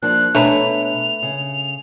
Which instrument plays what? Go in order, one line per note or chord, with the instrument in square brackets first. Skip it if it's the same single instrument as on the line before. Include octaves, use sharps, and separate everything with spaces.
[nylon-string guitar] F3 A#3 D4 [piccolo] F#6
[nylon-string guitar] B2 C#5 [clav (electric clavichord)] A3 B4 [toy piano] D4 A#5 [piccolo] F7
[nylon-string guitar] C#3